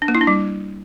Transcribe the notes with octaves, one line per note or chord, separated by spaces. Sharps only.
D4
A#3
E4
D4
G3